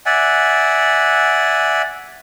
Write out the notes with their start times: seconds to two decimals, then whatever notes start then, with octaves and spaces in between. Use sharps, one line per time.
0.06 D5 E5 F#5 G#5